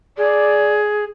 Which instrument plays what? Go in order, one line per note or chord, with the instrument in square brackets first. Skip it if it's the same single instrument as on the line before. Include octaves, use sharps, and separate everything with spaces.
[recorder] G#4 [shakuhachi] D5